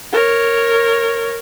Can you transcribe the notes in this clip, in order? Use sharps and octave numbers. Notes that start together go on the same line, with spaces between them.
A#4 C#5